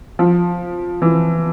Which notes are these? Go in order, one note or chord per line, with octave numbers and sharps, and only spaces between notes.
F3
E3